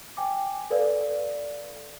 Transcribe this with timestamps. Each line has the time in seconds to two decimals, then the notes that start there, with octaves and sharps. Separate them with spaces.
0.17 G5 G#5 D6
0.70 A4 B4 D5 F5